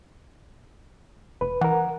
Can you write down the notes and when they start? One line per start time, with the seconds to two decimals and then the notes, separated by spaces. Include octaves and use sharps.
1.41 F1 B4
1.61 E3 A#4 F#5